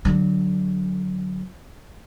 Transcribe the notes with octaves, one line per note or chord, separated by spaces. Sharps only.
D3 F#3